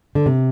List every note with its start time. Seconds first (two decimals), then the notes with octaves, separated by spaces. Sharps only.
0.15 D3
0.26 C3